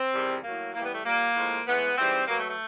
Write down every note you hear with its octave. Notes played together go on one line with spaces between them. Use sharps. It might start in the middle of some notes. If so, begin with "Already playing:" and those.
Already playing: C4
E2 C3 D#3 G3
A2 F#3 A#3
A2 E3 G3 A#3
B3
A3
A#2 G3 A#3
A2 F3 G#3
A2 E3 G#3 B3
G#2 E3 G3 C4
B2 F#3 A#3
A3
A3